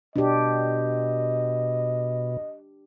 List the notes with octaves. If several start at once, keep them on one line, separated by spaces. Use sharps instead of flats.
B2 D4 G4 D#5